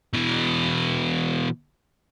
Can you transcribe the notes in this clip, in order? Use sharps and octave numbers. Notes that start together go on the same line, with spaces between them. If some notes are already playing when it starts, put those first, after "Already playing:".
B2 E3